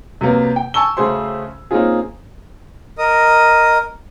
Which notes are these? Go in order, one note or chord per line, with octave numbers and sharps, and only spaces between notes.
C3 F#3 A#3 B3
G5
G#5 A5 C#6 E6 G7
C#3 A3 F#4 G#4 C5 C6
A#3 C4 C#4 D#4 F4 G#4
A#4 D#5 D#6